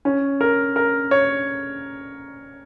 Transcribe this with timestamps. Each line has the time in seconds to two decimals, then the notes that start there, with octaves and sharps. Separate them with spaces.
0.05 C#4
0.41 A#4
0.76 A#4
1.11 C#5